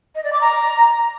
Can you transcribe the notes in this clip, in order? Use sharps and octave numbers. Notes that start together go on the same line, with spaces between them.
D#5
D5
D6
A#5